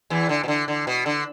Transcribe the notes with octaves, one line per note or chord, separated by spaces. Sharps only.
E2 E3
D3
B2
D3
D3
B2
D3